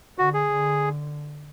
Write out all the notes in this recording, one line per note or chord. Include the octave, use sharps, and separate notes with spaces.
D3 F#4
G#4
D3